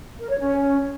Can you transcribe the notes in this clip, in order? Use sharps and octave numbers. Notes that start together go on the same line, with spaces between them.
A#4
C#5
C#4